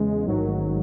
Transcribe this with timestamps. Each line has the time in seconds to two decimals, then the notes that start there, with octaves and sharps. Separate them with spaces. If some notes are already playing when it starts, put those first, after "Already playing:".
Already playing: E2 C#3 G#3
0.25 A1 G#2 D#3 F#3